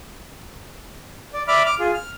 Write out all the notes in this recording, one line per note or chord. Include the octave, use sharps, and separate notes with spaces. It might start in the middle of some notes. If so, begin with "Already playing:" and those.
D5
D5 E5 B5 D6 F6
D6 F6
F4 G#4
F6